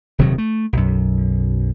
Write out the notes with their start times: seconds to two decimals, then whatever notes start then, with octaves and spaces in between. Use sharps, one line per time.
0.18 D#1 C3 D#3 F#3
0.38 A3
0.73 B1 F#2